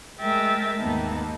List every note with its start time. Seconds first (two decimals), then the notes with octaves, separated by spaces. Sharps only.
0.19 G#3 A3 A#4 E5 G5 A6
0.79 D#2 G#2 A#3 B3 D#4 A5